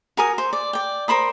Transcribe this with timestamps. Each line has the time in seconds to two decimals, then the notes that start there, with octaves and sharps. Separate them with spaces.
0.17 F#4 A#4 G#5 D#6
0.38 C5
0.53 D5
0.73 D5 G5
1.08 A#4 C5 B5 D#6